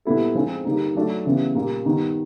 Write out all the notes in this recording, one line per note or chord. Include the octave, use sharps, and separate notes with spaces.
A#2 G3 B3 E4 A4
F3 G#3 C4
D3 G3 A#3 D#4
F#3 A3 D4 F#4
C#3 E3 G3 B3
A#2 G3 A#3
D#3 G3 B3 D#4